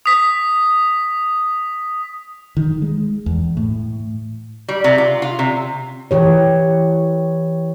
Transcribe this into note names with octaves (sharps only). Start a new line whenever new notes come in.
D#6 B6
D#3
G#3
E2
A2
G3
C3
F4
F4
C3
E3 G4 C#5